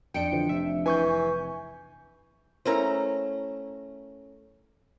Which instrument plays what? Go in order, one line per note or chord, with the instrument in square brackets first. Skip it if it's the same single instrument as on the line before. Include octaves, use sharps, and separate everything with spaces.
[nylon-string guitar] F2 D4 [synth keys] G5 C#7 D7
[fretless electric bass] D3 E3 F3
[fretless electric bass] F1 C3 [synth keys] E5
[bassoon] E3 [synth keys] G#5 C#6 G6
[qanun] A3 C#4 A#5 [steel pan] E4 A#4 C5